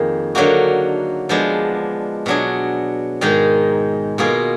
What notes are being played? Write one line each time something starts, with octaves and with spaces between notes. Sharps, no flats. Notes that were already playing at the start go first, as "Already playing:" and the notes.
Already playing: F2 D#3 A#3 G#4
D3 F#3 A#3 D#4 F#4
F3 G#3 B3 D4
B2 F#3 D4 G#4
G#2 D#3 G#3 D#4 G#4
B2 A#3 F4 G#4